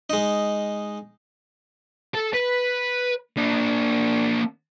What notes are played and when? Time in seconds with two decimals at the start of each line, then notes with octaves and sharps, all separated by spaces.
0.10 G#3 D#4
2.15 A4
2.34 B4
3.37 A#3 D4